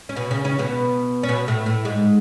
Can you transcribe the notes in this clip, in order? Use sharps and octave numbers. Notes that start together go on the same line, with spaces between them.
C#4
B2 B3
C#3 C#4
C#3 C#4
B2 B3
C#4
B2 B3
A2 A3
A2 A3
G#2 G#3